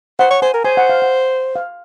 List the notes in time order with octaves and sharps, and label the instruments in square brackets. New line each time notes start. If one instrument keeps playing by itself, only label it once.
[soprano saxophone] C5 [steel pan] F#5
[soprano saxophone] C#5
[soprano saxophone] C5 [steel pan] G#5
[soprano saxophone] A#4
[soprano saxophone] C5 [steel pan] G#5
[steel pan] F#5
F5
F#5
F5